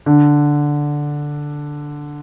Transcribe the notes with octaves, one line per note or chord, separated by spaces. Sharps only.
D3